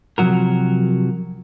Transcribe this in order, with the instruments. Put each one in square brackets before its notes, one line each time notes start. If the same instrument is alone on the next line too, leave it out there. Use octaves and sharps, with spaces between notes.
[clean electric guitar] C3 F3 F#3 F#4 A#4